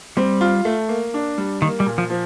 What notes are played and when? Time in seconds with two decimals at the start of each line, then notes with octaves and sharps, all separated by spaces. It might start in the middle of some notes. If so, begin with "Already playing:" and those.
0.17 G3 C4
0.41 F4
0.65 A3
0.89 A#3
1.14 D4
1.38 G3
1.62 D#3 A#3
1.80 G3
1.86 A#2
1.98 F3
2.10 F3